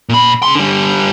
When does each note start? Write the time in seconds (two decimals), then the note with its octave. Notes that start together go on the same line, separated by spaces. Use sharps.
0.09 A#2 B5
0.43 C#3 C6
0.55 D3 G3